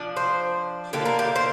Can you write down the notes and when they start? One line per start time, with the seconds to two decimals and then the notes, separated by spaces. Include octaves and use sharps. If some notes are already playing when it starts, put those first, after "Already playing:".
Already playing: F3 D4
0.17 C5
0.93 D3 A#3 D4 G4
1.05 A#4
1.19 G4
1.36 C5